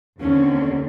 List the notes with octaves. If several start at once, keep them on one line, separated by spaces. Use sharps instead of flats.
D#2 D3 C4 C#4